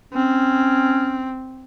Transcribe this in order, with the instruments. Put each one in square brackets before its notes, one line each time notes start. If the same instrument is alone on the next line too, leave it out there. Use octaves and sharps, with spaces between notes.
[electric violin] C4 [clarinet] C#4